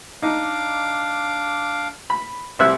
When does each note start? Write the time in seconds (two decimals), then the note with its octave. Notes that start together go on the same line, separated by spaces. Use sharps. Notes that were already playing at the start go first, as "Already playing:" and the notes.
0.22 D4 D#4 F5 D6
2.10 B5
2.59 C2 G3 G4 C5 E5 F#6